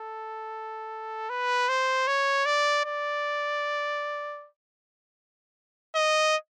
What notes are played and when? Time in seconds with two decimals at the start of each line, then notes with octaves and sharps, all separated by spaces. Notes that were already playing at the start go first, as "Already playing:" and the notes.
Already playing: A4
1.30 B4
1.69 C5
2.07 C#5
2.46 D5
2.85 D5
5.95 D#5